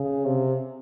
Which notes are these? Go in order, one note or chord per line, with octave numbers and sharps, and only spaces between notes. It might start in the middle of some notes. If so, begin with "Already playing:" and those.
Already playing: C#3
C3